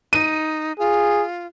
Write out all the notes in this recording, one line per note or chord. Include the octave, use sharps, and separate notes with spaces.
D#4 D#7
F4 G#4